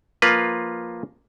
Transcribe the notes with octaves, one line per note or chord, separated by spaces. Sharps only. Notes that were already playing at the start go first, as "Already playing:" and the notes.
F3 A#3 F4 B4